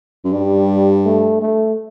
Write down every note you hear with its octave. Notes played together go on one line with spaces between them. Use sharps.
F#2
G2 G3
A3
A3